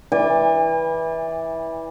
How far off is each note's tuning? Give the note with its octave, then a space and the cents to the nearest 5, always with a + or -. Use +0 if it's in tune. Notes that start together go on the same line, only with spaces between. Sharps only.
E3 -15 D5 +0 G#5 -45